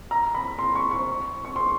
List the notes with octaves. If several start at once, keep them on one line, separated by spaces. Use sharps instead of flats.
A#5
B5
C6
C#6
C#6
C#6
C6